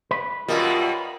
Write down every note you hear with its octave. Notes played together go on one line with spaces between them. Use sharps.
B4
F#2 B2 G3 F4 A#4 D#5